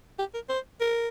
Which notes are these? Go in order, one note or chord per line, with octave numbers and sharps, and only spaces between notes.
G4
A#4
C5
A#4